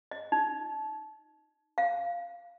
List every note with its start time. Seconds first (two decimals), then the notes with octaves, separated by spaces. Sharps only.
0.11 D#5
0.32 D#4
1.78 F5